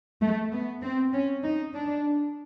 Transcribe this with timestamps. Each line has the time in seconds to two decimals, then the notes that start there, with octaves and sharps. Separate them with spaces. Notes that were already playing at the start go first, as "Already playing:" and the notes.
0.22 A3
0.52 B3
0.82 C4
1.13 C#4
1.43 D#4
1.74 D4